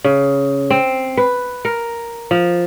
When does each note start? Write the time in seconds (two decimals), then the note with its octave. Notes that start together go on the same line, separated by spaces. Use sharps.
0.04 C#3
0.70 C4
1.17 B4
1.65 A#4
2.31 F3